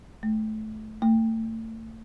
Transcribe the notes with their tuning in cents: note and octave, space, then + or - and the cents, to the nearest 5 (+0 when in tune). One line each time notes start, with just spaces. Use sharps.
A3 -20
A3 +35